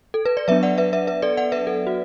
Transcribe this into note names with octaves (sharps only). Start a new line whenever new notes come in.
A4
B4
D5
F#3 B3 D4 B4 E5
D5 F#5
B4 E5
B4 E5
B4 E5
A4 D5
D5 F#5
B4 E5
A4
F#4